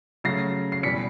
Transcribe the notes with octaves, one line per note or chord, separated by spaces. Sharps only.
C#3 F#3 A3 C#4 A#6 C7
C7
E2 B2 G3 B6 C#7